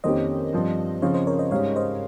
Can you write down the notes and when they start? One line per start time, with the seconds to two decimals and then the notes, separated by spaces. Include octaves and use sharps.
0.04 F2 D#3 A#3 C#4 G4 C5 D#5
0.53 G2 F3 C4
1.02 C#3 F3 C4 C#5 F5
1.14 C5 D#5
1.27 A#4 C#5
1.39 C5 D#5
1.51 G#2 G3 C#4 C#5 F5
1.76 C5 D#5